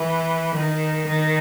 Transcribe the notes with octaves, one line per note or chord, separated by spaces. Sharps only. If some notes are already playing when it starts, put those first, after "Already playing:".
Already playing: E3
D#3
D#3